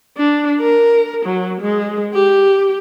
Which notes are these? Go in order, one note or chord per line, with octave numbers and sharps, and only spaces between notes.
D4
A#4
F#3
G#3
G4